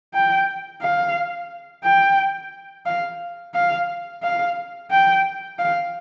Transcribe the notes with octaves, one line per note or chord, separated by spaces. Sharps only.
G5
F5
G5
F5
F5
F5
G5
F5